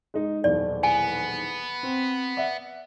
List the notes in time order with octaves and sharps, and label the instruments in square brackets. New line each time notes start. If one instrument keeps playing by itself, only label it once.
[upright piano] G#3 D#4
[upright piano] D#1 B1 E2 [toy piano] D5
[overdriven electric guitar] B3 [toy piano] G#5
[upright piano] C4
D5 E5 F#5